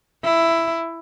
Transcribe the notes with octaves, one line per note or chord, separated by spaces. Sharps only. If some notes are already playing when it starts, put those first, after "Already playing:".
E4